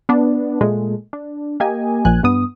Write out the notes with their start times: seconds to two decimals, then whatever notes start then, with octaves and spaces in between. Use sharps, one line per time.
0.09 B3 D4
0.61 A#2 G#3 A3
1.13 D4
1.60 A#3 G4 D#5 G#5
2.05 A#1 A#2 F3 G#5 F#6
2.23 G2 B3 D#6